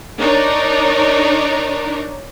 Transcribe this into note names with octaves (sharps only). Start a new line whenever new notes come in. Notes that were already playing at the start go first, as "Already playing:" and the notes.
D4 D#4 A#4 C#5 D5